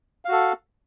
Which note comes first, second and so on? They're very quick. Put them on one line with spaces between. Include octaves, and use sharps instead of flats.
F5 F#4 A4